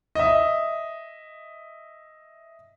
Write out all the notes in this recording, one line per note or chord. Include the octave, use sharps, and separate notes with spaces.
D#5 E5